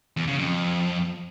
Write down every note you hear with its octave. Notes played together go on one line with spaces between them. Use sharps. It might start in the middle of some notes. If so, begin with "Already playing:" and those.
E2
C#3
F2